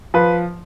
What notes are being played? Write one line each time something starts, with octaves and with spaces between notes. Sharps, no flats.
F3 B4